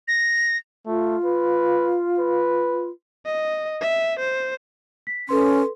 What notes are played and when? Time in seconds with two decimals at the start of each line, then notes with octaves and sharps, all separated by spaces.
0.08 A#6
0.86 A3 F4
1.25 B4
2.18 B4
3.26 D#5
3.81 E5
4.19 C5
5.07 B6
5.29 C#4 A4 B4 C6